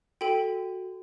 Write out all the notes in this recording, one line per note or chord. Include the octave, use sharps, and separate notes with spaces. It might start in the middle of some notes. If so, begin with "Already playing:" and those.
F#4 A4 G5